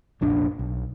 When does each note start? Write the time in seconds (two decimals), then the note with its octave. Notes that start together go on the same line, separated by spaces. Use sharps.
0.21 F1 A#1 D4
0.59 B1